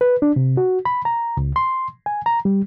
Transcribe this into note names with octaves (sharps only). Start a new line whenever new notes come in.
B4
D4
C3
F#4
B5
A#5
C#2
C6
G#5
A#5
G3